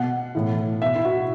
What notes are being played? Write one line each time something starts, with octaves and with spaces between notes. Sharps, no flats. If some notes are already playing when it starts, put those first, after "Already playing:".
Already playing: B2 F#5
A2 E3
B2 E5
E4
F#4